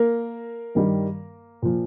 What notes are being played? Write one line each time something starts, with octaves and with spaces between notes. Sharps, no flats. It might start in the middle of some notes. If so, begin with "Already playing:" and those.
Already playing: A#3 A#4
G2 D#3 G3
A#2 F3